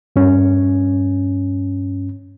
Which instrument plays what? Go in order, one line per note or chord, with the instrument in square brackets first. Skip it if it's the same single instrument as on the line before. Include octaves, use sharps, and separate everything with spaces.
[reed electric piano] G2 C#4